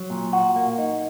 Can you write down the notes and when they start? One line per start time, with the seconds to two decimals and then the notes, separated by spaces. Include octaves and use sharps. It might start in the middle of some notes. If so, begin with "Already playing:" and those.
Already playing: F#3
0.10 A#2
0.33 F#4
0.56 A#3
0.79 D#4